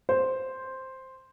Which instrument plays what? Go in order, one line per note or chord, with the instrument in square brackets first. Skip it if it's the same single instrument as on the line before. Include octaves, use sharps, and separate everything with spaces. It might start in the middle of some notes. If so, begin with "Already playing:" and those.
[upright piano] C5